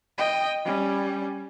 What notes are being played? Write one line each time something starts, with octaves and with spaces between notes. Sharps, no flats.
D#5 G5
G3 C#4